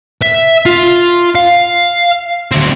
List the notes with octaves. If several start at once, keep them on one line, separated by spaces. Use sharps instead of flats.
E5
F4
F5
D2 C4